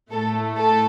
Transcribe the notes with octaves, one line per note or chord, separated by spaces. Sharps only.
A2 A3 A4
A4